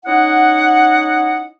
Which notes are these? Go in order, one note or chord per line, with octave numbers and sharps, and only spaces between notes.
C#4 D#4 E4 D#5 F#5